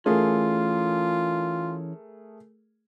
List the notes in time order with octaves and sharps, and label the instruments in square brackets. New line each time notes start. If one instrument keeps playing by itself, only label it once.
[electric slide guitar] E3 C#4 [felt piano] A3 G#4 A#4 [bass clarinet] F4